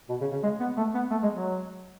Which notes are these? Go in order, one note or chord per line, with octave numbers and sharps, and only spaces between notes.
B2
C#3
C#3
G#3
B3
A3
B3
A3
G#3
F#3